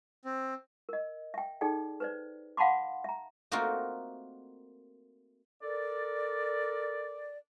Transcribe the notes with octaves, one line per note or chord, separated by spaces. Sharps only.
C4
A#4 D#5
E5 G5
D#4 G#4 A4 D5 G5
B4 C5 D5
F5 F#5 A5 B5 C6 D6
E5 A#5
A3 A#3 C4 D#4 F4 F#4
A4 A#4 D5